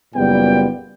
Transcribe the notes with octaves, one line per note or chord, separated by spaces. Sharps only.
F#1 A#2 G3 B3 G5